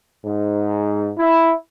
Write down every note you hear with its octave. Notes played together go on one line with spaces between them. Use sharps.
G#2
E4